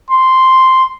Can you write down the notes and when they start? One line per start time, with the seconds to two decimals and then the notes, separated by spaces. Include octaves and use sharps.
0.10 C6